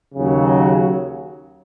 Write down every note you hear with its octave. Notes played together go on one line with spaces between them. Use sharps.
D#2 C#3 F#3